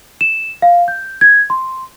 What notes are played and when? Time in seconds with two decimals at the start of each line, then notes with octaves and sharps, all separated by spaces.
0.21 E7
0.62 F5
0.88 G6
1.21 G#6
1.50 C6